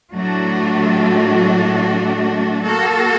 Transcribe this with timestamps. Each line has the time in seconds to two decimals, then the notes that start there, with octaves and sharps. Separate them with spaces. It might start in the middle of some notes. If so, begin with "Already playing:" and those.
0.13 A2 F#3 A3 D4 F#4
2.63 A#3 F#4 A4